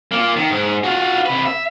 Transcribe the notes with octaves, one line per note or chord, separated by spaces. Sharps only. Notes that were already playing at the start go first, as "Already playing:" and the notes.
A#3 F4
D#3
G#2
F4 F#4
C3 B4
E5